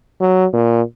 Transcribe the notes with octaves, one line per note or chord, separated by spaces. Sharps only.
F#3
A#2